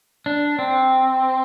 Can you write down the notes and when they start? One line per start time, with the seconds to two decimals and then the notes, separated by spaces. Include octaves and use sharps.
0.26 D4
0.59 C4